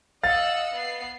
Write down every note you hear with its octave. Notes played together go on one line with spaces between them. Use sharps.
D#5 F5 F#5 E6 A6
B3 C7